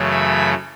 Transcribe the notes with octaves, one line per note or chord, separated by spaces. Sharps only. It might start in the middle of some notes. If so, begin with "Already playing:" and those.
Already playing: F#2 C#3 E3 A3
B5